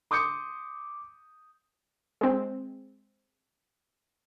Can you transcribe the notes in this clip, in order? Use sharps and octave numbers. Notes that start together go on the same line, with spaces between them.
C6 D6 D#6 G6 C#7
G#3 C4